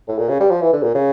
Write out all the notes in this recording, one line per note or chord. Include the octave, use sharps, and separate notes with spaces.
A2
A#2
C#3
G3
F3
E3
D3
A#2
C#3